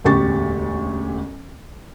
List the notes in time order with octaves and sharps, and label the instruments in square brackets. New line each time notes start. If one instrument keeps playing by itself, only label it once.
[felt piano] E1 A1 D2 G4 C#6 A6